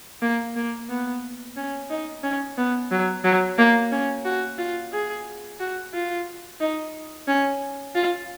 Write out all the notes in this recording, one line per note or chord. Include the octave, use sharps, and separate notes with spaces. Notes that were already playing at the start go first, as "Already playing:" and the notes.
A#3
A#3
B3
C#4
D#4
C#4
B3
F#3
F#3
A#3
C#4
F#4
F4
G#4
F#4
F4
D#4
C#4
F4